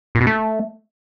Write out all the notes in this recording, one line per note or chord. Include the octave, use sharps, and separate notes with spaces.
A#2
B2
A3